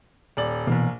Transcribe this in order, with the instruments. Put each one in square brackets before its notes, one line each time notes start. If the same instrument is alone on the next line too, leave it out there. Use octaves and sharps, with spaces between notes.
[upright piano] D#1 D5 F#7
[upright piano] A#1 A#3 [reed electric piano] B2 E3